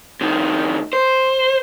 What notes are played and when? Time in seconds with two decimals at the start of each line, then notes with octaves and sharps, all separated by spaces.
0.21 A2 D#3
0.93 C5